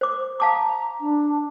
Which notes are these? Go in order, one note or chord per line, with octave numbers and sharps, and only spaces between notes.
C5 D6
F5 A5 A#5 D6
D4